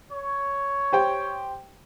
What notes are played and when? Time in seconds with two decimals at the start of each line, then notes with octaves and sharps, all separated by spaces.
0.12 C#5
0.93 G4 C5 G5